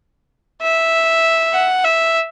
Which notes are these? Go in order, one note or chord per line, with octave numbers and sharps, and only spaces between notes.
E5
F#5
E5